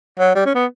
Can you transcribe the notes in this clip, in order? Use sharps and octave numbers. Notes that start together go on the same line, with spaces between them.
F#3
G3
C#4
B3